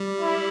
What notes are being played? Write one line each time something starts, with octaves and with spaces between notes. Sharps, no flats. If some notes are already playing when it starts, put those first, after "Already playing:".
Already playing: G3
E4